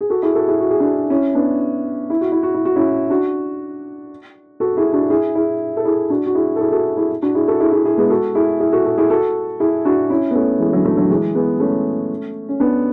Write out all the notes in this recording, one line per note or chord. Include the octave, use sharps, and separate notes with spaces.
G#4
F#4 A4
E4 G#4
F#4 A4
E4 G#4
F#4
G#4
D4 F#4
C#4 E4
B3 D4
E4
F#4
E4
F#4
E4
F#4
C#4 E4
D4 F#4
F#4 A4
E4 G#4
D4 F#4
E4 G#4
E4 G#4
A4
E4 G#4
D4 F#4
F#4
E4 G#4
A4
E4 G#4
F#4 A4
E4 G#4
D4 F#4
E4 G#4
F#4 A4
E4 G#4
E4 G#4
E4 G#4
G#3 B3
F#4 A4
E4 G#4
E4 G#4
F#4 A4
F#4 A4
E4 G#4
F#4 A4
E4 G#4
D4 F#4
C#4 E4
B3
A3 C#4
E3 G#3
D3 F#3
F#3 A3
D3 F#3
E3 G#3
G#3 B3
A3 C#4
C#4
B3 D4